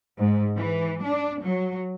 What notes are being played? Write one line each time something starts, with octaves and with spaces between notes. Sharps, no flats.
G#2
E3
D4
F#3